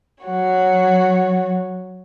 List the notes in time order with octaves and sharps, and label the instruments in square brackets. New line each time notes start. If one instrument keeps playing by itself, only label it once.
[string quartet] F#3 F#4 C#5